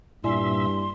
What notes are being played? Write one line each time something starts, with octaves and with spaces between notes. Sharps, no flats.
G2 A#2 E4 D5 E5 G#5 C6